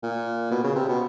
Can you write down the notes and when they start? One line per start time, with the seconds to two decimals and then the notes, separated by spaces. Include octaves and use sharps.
0.03 A#2
0.51 B2
0.64 C#3
0.75 C3
0.88 B2